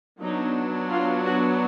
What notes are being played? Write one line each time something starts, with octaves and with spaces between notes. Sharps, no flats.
F#3 B3 D4 D#4
F4
F#4